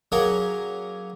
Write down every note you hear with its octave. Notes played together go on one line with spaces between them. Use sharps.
F#3 A#3 C#4 G#4 A#4